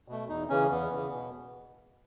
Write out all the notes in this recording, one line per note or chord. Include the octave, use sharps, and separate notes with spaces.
B2 A3
E2 D#4
C#3 E3 C#4
E2 B3
C#3 E3
B2